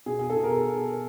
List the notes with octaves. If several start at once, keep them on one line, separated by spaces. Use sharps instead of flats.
B2 G#4
G#4
A4
B2
A#4